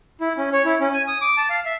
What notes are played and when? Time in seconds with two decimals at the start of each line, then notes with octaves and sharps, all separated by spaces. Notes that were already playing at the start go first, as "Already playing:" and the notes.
0.21 E4
0.37 C#4
0.53 C#5
0.65 E4
0.80 C#4
0.93 G#5
1.08 D#6
1.21 D6
1.37 A5
1.50 F5
1.66 E5